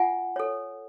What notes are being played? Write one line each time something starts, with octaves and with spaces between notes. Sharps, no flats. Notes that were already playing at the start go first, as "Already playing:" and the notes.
Already playing: F4 F#5 G#5
A4 C#5